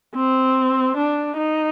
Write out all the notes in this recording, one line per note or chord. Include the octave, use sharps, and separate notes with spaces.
C4
D4
D#4